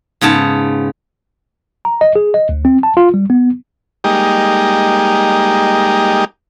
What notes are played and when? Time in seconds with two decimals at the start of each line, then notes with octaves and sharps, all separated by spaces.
0.21 G#2 C#3 B3 A5
1.85 A#5
2.01 D#5
2.16 G#4
2.34 D#5
2.49 D2
2.65 C4
2.83 A5
2.97 F4
3.14 G3
3.30 B3
4.04 G3 G#3 A#3 D#4 G4